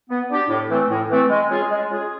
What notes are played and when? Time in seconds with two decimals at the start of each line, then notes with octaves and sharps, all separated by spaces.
0.10 B3
0.29 D4 G4
0.49 A2
0.69 E3 A3 C4
0.90 A2
1.09 E3 A3 C4
1.29 G#3
1.49 C#4 F4 G#4
1.70 G#3
1.89 C#4 F4 G#4